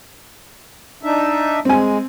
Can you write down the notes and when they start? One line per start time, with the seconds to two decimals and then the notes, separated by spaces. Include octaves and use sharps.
1.03 D4 D#4 E5
1.65 G#3 C4 G#5